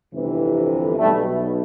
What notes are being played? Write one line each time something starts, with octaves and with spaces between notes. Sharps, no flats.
G1 F2 C3 E3
B1 B2 G3 A3